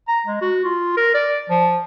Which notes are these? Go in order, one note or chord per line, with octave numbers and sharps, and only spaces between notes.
A#5
G#3
F#4
F4
A#4
D5
F3